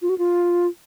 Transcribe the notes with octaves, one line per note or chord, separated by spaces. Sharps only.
F4
F#4
F4